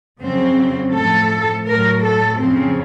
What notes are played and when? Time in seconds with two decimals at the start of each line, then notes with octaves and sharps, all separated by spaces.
0.21 F2 C#3 F#3 C4
0.93 A2 F3 A4
1.66 A2 F#3 A#4
2.03 A4
2.39 F2 C#3 F3 C4